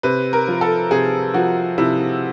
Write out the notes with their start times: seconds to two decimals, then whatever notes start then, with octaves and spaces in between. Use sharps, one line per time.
0.03 C3 B4
0.33 A#4
0.48 F3
0.61 A4
0.91 C3 G#4
1.34 F3 F#4
1.78 C3 E4